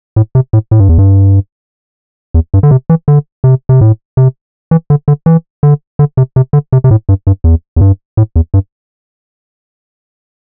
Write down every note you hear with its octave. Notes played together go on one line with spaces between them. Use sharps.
A2
C3
A2
A2
G2
E2
G2
E2
G2
D3
C3
E3
D3
C3
C3
A2
C3
E3
D3
D3
E3
D3
D3
C3
C3
D3
C3
C3
A2
G2
G2
E2
E2
G2
A2
E2
G2